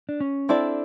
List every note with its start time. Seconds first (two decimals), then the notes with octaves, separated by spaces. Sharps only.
0.09 D4
0.20 C#4
0.49 C4 D4 E4 A4 D5